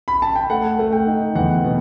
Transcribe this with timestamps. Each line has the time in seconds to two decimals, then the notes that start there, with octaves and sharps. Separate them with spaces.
0.08 B5
0.22 A5
0.35 G5
0.50 A3 F#5
0.79 A3
0.92 G5
1.07 D#4
1.35 E2 F#5
1.64 B2